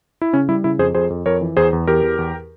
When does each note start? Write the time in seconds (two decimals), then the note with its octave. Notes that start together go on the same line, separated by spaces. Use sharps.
0.22 E4
0.33 C#3 C#4
0.49 G3 E4
0.64 C#3 E4
0.79 F2 G#4 C5
0.94 F2 G#4 C5
1.10 F2
1.26 F2 A#4 C#5
1.41 E3
1.57 E2 G#4 C5
1.73 E2
1.87 E2 G4 A#4
2.03 E2
2.18 E2